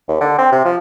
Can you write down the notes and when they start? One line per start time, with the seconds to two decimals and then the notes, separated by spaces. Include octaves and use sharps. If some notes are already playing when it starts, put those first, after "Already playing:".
0.08 D#2
0.21 D3
0.38 C4
0.52 C3
0.65 F3